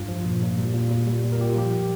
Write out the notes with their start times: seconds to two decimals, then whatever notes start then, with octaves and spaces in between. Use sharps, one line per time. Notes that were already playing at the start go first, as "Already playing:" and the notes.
Already playing: G2 F4
0.08 F3
0.25 A#2
0.42 A#2
0.58 G3
0.74 A#2
0.91 A#2
1.07 G3
1.24 A#2
1.32 A#4
1.39 A#2 G4
1.50 F4
1.57 F3 G4